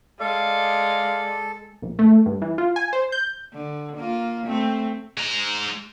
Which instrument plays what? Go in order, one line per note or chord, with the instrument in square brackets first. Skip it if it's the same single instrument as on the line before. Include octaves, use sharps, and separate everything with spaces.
[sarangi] G#3 [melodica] A4 [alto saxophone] D5 [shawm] F5
[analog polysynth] A#1
A3
G2
E3
F4
G#5
C5
G6
[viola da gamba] D3
A#3 F4
A3 C4
[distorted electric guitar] G#3 A#5